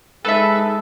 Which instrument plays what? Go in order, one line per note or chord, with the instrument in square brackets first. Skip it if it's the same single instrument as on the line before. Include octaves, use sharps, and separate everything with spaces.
[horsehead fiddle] G#3 D#4 [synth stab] A4 [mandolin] B4 E5